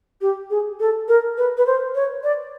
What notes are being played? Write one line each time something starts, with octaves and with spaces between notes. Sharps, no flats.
G4
G#4
A4
A#4
B4
B4
C5
C#5
D5